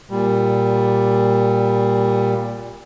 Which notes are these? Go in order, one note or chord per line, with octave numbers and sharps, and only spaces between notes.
A#2 G3